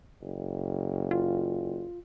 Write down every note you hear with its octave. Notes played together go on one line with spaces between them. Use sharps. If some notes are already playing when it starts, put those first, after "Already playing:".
F#1
F4